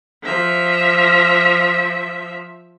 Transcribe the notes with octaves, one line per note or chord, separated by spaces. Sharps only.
F3 E5